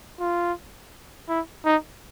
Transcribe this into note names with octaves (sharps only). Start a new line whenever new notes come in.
F4
E4
D#4